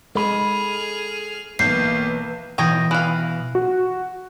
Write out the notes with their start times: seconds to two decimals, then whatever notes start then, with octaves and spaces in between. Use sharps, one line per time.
0.15 G#3 G#4 A4 B5 F6
1.59 B1 E3 A#3 G6 C7
2.58 B2 E3 C#5 D#5 G5
2.91 E3 F5 F#6
3.55 F#4